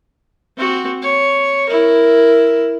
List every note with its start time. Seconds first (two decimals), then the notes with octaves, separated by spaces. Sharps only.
0.57 C4 F#4
1.02 C#5
1.69 E4 A#4